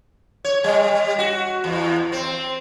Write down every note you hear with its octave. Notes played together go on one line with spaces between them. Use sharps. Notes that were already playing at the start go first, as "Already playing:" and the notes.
C#5
G3
F#4
E2
C4